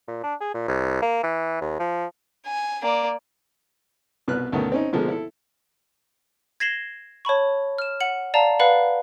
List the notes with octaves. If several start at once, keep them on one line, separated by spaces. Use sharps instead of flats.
A#2
D4
G#4
A#2
C2
A#3
E3
D#2
F3
G#5
A#3 D5
C2 B2 B4 F6 F#6
D2 B2 D#3 B3 C#4
C4 C#4 D#4
B2 D3 F3 G#3 A#3 C4
E4 A4
G#6 A#6 C7 E7 F#7 G7
C#5 A5 B5 C#6
F6 E7
F#5 C#7 F#7
D5 F5 A5 A#5
B4 D5 F5 F#5 B5